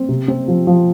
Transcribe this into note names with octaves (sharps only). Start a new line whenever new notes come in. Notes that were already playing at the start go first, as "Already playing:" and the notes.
Already playing: C4
C3
C4
F3
F3